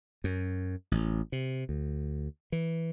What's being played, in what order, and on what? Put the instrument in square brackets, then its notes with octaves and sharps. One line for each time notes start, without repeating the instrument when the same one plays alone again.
[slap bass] F#2
A1
C3
D2
E3